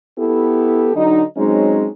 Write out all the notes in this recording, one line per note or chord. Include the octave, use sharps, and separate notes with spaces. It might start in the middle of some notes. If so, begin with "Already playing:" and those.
B3 E4 G4 A4
D3 F#3 D#4
F#3 G#3 C4 C#4 D#4